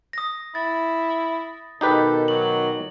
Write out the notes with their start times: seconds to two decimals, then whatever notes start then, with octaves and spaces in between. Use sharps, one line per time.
0.13 D#6 A#6
0.55 E4 A6
1.81 B2 D#3 D#4 G4 A4 B4
2.28 F#3 F#7